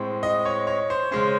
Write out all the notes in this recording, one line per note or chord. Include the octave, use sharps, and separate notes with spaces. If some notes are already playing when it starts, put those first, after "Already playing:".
Already playing: A2 G#3 C4
D#5
C#5
C#5
C5
C#3 G#3 C#4 C5